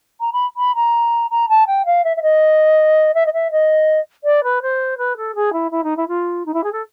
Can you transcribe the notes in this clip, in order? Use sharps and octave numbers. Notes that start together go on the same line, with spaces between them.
A#5
B5
B5
A#5
A#5
A5
G5
F5
E5
E5
D#5
E5
D#5
E5
D#5
D5
B4
C5
B4
A4
G#4
E4
E4
D#4
E4
F4
D#4
E4
G#4
A4